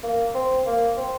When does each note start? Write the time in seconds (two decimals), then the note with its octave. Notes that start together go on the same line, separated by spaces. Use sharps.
0.03 A#3
0.34 C4
0.66 A#3
0.97 C4